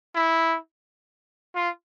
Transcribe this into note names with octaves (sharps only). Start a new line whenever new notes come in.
E4
F4